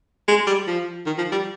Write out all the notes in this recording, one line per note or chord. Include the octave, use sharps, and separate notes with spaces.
G#3
G3
F3
D#3
F3
G3